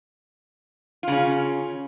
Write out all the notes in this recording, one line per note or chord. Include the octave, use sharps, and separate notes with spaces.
C#3 C#4 F4